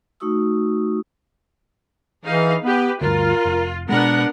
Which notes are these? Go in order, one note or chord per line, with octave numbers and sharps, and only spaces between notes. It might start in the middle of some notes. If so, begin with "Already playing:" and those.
A3 D#4 F#4 C#6 D#6 E6
E3 D#4 G#4 F5
B3 G4 B4
D2 G2 F4 A#4
F1
B2 G#3 B3 D4 A#4 F#5